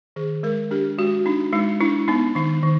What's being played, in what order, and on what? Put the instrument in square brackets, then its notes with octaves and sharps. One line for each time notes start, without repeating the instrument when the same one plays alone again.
[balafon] D#3 G#4
G#3 A#4
D4 G4
G#3 F#4
D4 D#4
G#3 D#4
D4 E4
B3 D#4
D#3 D#4
D#3